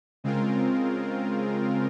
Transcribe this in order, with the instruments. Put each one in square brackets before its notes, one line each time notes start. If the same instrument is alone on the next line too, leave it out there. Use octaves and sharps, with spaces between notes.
[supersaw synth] C#3 G#3 C4 F4 A#4